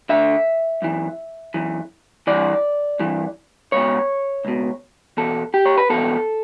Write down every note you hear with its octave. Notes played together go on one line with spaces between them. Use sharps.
D2 D3 E5
F#2 E3
F#2 E3
G2 E3 D5
G2 E3
C#2 B2 C#5
C#2 B2
E2 B2 A4
G4
C#5
B4
E2 B2 A4